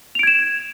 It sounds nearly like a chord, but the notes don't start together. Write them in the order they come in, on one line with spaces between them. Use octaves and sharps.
F7 D7 G#6 E7